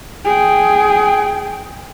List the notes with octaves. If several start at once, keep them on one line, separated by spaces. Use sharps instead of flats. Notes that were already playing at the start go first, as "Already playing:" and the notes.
G#4 G5